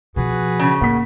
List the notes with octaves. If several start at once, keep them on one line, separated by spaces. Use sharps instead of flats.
B2 F3 F#4 G#4 B4
C#3
A2 A#3 F#5 B6